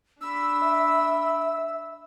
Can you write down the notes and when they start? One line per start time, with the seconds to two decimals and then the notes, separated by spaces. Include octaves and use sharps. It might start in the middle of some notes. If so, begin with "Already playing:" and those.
0.21 D4 B5 E6
0.62 E5